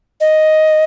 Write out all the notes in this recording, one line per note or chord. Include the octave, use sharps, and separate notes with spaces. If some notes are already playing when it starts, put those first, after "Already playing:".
D#5